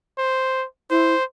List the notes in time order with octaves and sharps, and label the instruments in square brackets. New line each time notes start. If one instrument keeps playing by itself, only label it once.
[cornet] C5
[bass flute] E4 [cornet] C5